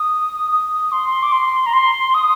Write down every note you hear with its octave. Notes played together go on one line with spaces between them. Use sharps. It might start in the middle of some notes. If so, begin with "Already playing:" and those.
Already playing: D#6
D#6
C6
D6
C6
A#5
C6
D#6